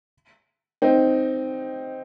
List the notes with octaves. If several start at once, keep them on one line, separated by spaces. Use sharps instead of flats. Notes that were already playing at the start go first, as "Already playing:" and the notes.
C4 D#4